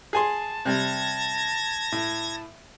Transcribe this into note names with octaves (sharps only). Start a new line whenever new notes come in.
G#4 G#5 A5 C6
C3 G3 G#6 A#6
A2